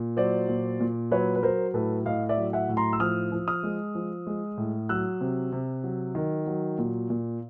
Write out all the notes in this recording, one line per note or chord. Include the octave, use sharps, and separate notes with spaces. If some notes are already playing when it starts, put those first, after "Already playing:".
Already playing: A#2
F#3 C5 D5
A#2
A#2
F#3 B4 C#5
B4
F#3 A#4 C5
A2 A4 B4
A2 D#5 F5
D5 E5
F#3
E5 F#5
A2
A#5 C6
E6
F3 D#6 F6
F3
D#6 F6
G#3
F3
G#3
A2
F#3 E6 F#6
C3
C3
F#3
D#3
F#3
A#2
A#2